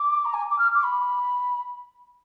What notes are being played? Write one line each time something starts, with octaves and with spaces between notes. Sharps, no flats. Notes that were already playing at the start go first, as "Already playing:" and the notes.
Already playing: D6
A#5
G#5
D6
F6
D6
B5